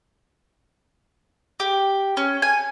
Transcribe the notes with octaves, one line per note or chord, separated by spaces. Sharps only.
G4
C#4
G#5